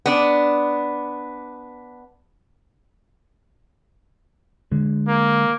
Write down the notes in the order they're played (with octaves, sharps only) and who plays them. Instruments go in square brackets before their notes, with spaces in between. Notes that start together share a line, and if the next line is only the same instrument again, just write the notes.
[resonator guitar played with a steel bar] B3 D4
[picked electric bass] D3 G#3
[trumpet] A#3